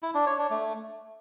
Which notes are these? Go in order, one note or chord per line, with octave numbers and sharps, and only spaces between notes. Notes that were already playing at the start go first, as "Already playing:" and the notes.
E4
D4
C#5
D4
A3